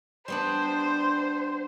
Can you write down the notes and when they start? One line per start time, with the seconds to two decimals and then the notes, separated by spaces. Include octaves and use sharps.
0.28 G3 B3 D4 C5